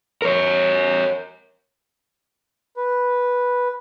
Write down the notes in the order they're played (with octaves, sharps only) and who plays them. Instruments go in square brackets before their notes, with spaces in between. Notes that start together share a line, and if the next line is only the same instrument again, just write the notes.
[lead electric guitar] A#4 C#5
[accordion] B4